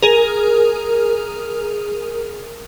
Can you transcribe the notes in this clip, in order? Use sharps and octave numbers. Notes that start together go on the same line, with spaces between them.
G#4 A#4